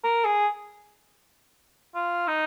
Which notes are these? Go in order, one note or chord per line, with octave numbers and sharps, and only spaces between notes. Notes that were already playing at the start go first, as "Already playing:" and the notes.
A#4
G#4
F4
D#4